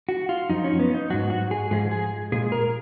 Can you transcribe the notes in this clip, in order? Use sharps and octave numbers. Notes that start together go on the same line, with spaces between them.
F#4
F4
F#2 F3 D#4
C#4
B3
D#4
G#2 F#3 F#4
F#4
G#4
G#2 F3 G#3 G#4
G#4
A#2 G#3 G#4
A#4